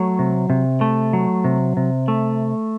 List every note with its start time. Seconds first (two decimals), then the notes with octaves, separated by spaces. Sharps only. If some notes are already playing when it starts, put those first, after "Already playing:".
Already playing: F#3 A3 C#5
0.19 C3
0.50 C3
0.81 A3
1.13 F#3
1.44 C3
1.77 C3
2.08 A3